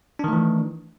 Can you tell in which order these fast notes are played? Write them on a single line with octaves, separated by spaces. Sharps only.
D4 D#3 A3 E3